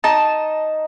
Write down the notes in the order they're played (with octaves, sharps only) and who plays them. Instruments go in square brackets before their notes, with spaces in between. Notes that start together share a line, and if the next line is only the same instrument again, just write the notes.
[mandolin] D#4 A5